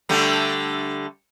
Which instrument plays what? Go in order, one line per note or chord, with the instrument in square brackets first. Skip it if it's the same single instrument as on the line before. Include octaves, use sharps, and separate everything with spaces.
[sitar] D3 G3 A3